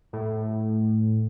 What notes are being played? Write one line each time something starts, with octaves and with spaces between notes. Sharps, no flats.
A2